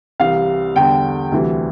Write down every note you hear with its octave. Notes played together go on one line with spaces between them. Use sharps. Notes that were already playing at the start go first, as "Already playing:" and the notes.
C2 C3 E3 G3 F5
E2 D3 G3 G5
D2 C3 E3 G3